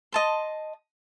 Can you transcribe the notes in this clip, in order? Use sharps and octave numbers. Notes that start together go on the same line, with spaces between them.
D#5 A5 C6